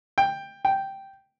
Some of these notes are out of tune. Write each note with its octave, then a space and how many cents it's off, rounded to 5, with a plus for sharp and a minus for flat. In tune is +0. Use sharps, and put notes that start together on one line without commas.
G5 +10
G5 -5